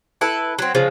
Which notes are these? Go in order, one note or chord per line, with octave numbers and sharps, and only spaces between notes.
E4 A4 B4
F#3 C4
C#3 F3 G#3